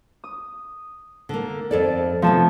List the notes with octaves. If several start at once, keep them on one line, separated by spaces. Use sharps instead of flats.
D#6
D3 A#3
F2 A4 D5
C3 F3 A3 B3 A5